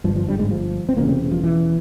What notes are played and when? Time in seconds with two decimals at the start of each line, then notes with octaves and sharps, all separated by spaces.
0.04 G2 F3
0.08 G1
0.16 F3
0.28 G2 G3
0.39 G#2 G#3
0.51 F3
0.89 C4
0.97 E1 E2 A#2 C#3 A#3
1.08 C3 C4
1.31 F3
1.43 E3